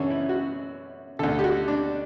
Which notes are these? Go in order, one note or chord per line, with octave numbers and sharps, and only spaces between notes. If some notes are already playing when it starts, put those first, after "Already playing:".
Already playing: F#2 C#3 E3 C#4 D4
E4
F#4
D2 D3 A4
G4
F#4
D4